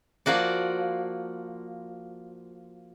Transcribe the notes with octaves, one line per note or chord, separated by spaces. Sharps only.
F3 A#3 F#4 D5